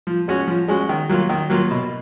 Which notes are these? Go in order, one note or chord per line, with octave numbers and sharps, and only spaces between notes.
F3
G#3 C#4 F#4
F3
G#3 C#4 F#4
D#3
F#3 A#3 F4
D#3
F#3 A#3 F4
B2